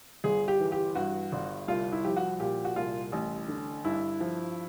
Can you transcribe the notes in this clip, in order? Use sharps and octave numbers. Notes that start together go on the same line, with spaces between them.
G1 G#4
G4
E3
G4
G2 F#4
G1
C2 F4
E4
F3 G4
F#4
A#2 G4
F#4
C2 F4
A1
D3
G2 E4
F3